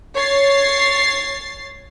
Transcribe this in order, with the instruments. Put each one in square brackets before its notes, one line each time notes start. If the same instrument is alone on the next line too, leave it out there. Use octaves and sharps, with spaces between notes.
[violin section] C#5 A6 C7